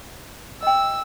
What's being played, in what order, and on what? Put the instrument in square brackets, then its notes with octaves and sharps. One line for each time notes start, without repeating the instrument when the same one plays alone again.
[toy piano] D#5 G5 [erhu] E6